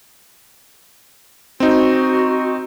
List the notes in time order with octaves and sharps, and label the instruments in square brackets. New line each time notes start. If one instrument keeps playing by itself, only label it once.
[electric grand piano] C4 D#4 [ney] F#4